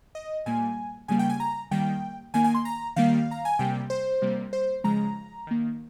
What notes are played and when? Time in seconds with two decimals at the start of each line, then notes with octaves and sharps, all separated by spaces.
0.15 D#5
0.46 A#2 G3 A#3 G#5
1.08 C#3 G3 A#3 G#5
1.19 G5
1.29 G#5
1.40 A#5
1.71 D#3 G3 A#3 G5
2.34 D#3 A#3 G#5
2.44 G#5
2.54 C6
2.65 A#5
2.96 D#3 G3 A#3 F5
3.31 A#5
3.45 G#5
3.59 C3 G3 A#3 G5
3.90 C5
4.22 C3 G3 A#3
4.53 C5
4.84 C#3 F3 G#3 A#5
5.47 D#3 A#3